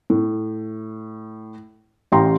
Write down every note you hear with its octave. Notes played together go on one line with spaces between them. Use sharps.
A2
A1 G4 F5 G5 A#5 C6